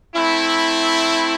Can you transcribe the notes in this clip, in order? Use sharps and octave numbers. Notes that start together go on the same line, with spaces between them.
A3 C4 E4